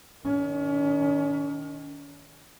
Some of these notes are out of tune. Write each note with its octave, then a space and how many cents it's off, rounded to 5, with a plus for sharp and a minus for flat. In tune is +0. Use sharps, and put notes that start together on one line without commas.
D#3 +0 C#4 +40